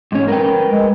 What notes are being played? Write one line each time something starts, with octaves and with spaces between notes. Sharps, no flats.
G#2 C#4
A#4 B4 G5
G#3